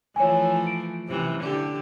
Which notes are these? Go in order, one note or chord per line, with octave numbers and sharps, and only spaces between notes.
E3 F3 A3 C#5 G#5
D7
F#2 C3 E3
D3 G4